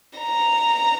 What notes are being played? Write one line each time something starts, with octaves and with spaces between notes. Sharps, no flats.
A#5